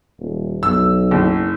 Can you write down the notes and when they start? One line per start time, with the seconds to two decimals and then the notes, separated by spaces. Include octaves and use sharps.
0.19 D#1
0.63 B1 E6
1.11 F#1